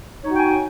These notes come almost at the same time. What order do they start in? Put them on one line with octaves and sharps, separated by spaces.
C#5 D#4 F#4 G5 G#5